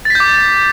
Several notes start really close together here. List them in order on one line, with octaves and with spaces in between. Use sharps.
A6 B6 G6 D6